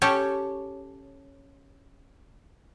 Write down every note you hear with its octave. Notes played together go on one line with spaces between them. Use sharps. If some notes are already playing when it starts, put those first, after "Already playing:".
C#4 G4 A4 C#5